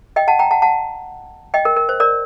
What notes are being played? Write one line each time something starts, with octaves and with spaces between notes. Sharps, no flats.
D#5 G5
F#5 A5
G5 A#5
F#5 A5
F#5 A5
D#5 G5
A#4
A#4
C5
A#4 D5